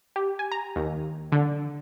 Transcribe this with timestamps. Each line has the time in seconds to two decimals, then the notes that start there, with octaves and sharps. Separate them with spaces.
0.16 G4
0.39 G#5
0.52 A#5
0.76 D#2
1.32 D3